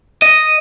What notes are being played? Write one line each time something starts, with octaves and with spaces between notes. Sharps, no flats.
D#5